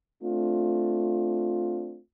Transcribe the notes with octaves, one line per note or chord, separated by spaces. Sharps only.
A3 C4 D4 F4